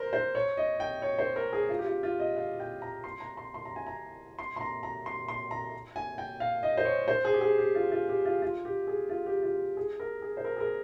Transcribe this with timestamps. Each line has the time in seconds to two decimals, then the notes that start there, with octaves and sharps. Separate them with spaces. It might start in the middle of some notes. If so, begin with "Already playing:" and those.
Already playing: A#4 C5
0.13 C5
0.35 C#5
0.57 D#5
0.80 G5
1.02 C#5
1.19 C5
1.36 A#4
1.53 G#4
1.69 F4
1.79 G4
1.87 F4
2.03 F4
2.19 D#5
2.37 F5
2.60 G5
2.82 A#5
3.04 C6
3.20 A#5
3.37 C6
3.54 C6
3.65 A#5
3.76 G#5
3.87 A#5
4.39 C6
4.56 C6
4.61 A#5
4.83 A#5
5.06 C6
5.28 C6
5.51 A#5
5.96 G#5
6.18 G5
6.40 F5
6.63 D#5
6.77 C5
6.85 C#5
7.08 C5
7.25 G#4
7.33 G4
7.41 G#4
7.58 G4
7.75 F4
7.92 F4
8.09 G4
8.25 F4
8.42 F4
8.65 G4
8.87 G#4
9.09 F4
9.26 G4
9.43 F4
9.77 G#4
10.00 A#4
10.22 G#4
10.37 C5
10.45 A#4
10.56 G#4
10.60 A#4